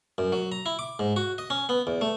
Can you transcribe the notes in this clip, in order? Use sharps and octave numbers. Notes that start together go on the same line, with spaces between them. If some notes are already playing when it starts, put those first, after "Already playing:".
F#2
F#3
A#5
E4
D6
G#2
F#4
D#5
C#4
B3
E2
A3